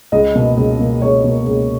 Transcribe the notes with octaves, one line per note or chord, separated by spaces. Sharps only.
C#2 D#5
B2 A#3
C#2
B2 A#3
C#2 C#5
B2 A#3
C#2